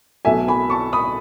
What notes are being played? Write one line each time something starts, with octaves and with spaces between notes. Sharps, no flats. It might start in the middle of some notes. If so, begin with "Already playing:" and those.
B1 B2 A3 E5 G#5
G#5 B5
A5 C#6
B5 D#6